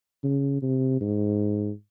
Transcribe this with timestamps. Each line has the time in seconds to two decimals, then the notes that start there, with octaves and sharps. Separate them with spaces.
0.24 C#3
0.62 C3
1.01 G#2